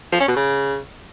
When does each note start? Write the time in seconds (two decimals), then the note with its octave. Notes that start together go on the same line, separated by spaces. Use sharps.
0.12 F3
0.20 C#4
0.28 B2
0.36 C#3